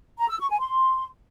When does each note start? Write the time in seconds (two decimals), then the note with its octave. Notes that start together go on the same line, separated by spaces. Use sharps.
0.19 A#5
0.29 E6
0.39 C#6
0.49 G#5
0.60 C6